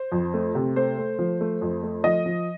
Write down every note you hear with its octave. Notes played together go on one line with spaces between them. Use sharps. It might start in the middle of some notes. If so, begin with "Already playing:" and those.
Already playing: C5
F2
A3
C3
A3 C5
A3
F3
A3
F2
A3
F3 D#5
F3